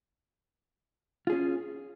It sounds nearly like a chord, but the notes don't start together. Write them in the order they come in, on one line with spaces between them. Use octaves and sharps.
F4 G#4 C#4